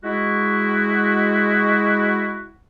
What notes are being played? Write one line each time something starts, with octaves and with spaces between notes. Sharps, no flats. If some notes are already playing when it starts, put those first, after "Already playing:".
G#3 E4 F#4